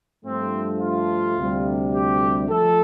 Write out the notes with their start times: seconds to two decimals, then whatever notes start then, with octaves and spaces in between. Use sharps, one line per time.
0.24 G2 F3 A3 C4
0.80 F4
1.37 D2 C3 G3
1.93 G4
2.49 F3 A3 A4